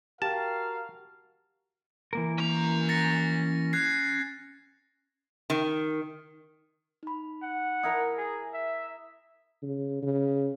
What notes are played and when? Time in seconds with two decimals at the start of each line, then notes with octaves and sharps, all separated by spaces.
0.22 F#4 G4 A#4 F5 A5
2.13 E3 A#3 A#4
2.38 C#4 A#5
2.89 A6 A#6 C#7
3.73 F#6 G#6 C7
5.50 D#3
7.03 D#4 B5
7.42 F#5
7.83 E4 A#4 A#5 D#6
8.17 G#4
8.53 E5
9.63 C#3
10.03 C#3